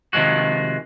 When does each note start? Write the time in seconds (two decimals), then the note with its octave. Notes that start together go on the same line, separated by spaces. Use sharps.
0.13 C3 D#3 F3 G#3 F#4